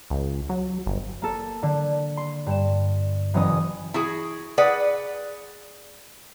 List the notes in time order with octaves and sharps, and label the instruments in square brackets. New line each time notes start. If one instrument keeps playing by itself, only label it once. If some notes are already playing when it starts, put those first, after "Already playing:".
[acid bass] C#2
F#3
G1
[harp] A#3 A4
D3
C6
G2 E7
F#1 E3 C#4 D#5 D#6
[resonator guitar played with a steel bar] E4 F#4 G#4
G#4 B4 D5 F#5